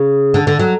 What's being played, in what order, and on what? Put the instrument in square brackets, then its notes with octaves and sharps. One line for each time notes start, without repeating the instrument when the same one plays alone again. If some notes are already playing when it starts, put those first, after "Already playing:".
Already playing: [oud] C#3
D3
D3
F#3